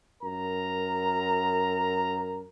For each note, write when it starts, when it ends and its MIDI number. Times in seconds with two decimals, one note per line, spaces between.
0.21 2.42 42
0.21 2.42 70
0.21 2.42 82